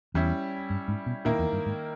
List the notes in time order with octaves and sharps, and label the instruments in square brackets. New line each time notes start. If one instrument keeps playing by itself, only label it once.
[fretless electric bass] E2 [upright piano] G3 C#4 E4
[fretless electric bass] G2
G#2
B2
[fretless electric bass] A#2 [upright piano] D#3 A#3 E4 A#4
[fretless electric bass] E2
G2
G#2